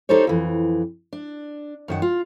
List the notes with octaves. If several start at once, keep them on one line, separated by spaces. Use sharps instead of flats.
D#4 G4 A4 C5 C#5
F2 E3
D4
F#2 D#3 F#5
F4